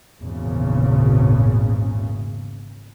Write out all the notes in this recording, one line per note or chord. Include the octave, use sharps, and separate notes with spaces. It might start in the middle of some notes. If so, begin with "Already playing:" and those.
G#1 E2 A#2 C#3